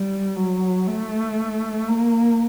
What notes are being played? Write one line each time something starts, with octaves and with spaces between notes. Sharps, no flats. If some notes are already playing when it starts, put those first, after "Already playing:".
Already playing: G3
F#3
A3
A#3